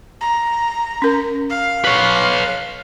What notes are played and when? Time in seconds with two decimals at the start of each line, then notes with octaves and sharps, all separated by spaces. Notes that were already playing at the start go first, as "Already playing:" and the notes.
0.21 A#5
1.02 C#4 A#4
1.50 F5
1.85 B4 C#5